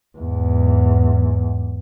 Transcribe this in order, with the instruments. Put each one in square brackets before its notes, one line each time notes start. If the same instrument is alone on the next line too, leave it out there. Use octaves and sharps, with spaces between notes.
[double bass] E2 G#2